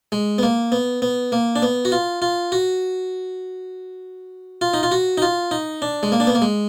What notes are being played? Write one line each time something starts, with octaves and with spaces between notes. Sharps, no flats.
G#3
B3
A#3
B3
B3
A#3
D4
B3
F#4
F4
F4
F#4
F4
D#4
F4
F#4
D#4
F4
D#4
D4
G#3
A#3
D4
B3
A#3
G#3